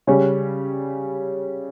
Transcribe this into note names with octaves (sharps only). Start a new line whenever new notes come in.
C#3 G3 C#4